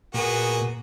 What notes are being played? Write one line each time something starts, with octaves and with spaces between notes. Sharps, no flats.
A#2 B3 F#4 G#4